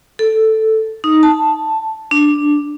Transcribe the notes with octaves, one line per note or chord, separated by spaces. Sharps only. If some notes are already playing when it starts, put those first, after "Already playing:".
A4
D#4
A5
D4